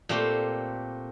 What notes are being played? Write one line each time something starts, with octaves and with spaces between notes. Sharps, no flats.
A#2 A3 C4 G4 C5